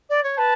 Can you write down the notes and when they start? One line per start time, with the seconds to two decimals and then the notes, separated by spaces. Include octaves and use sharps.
0.09 D5
0.23 C#5
0.37 B4 A5